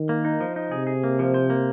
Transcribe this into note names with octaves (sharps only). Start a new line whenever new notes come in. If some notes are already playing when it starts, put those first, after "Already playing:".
Already playing: D#3
A#3
D#4
F3
D#4
C3 G#4
G#4
A#3
F3
C5
A#3